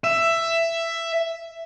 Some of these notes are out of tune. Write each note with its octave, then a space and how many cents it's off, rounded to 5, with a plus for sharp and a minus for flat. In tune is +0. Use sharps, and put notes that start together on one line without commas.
E5 +10